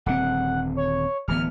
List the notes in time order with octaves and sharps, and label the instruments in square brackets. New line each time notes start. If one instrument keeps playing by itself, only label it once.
[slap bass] D#1 D3 C4 [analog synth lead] F#5
[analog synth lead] C#5
[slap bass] D1 E3 B3 [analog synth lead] F6